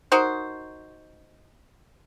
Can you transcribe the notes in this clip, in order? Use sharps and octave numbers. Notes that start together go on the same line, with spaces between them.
D#4 F#4 A#4 C5